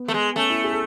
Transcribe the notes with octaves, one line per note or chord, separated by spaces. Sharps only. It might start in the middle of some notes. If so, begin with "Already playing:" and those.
Already playing: B3
A3
G#3
A3 C#4
E4
G#4
A4